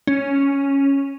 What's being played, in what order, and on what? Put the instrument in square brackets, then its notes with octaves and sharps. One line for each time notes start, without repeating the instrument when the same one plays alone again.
[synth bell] C#4